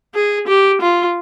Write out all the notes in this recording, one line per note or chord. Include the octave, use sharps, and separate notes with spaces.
G#4
G4
F4